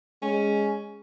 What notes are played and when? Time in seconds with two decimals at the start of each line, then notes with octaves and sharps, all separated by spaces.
0.22 G#3 C#4